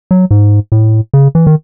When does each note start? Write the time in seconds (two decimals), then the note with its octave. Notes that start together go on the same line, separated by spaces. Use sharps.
0.11 F#3
0.31 G#2
0.72 A2
1.14 C#3
1.35 E3
1.47 D#3